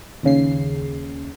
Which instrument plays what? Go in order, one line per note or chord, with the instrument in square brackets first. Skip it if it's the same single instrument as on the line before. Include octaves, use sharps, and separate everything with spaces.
[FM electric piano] D#2 C#3 C7